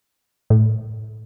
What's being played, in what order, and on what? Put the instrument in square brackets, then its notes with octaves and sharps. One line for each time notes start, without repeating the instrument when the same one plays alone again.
[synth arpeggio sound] A2